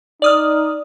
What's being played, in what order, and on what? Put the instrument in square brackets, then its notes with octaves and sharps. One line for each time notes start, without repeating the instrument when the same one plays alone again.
[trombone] D#4 [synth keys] D5 D#6 F6